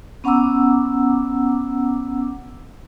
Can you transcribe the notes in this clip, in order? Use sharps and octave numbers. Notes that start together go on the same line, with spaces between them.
B3 C#4 F#5 A#5 D6 E6